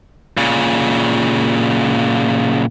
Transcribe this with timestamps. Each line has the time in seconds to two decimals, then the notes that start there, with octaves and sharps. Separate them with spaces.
0.37 A#2 C#3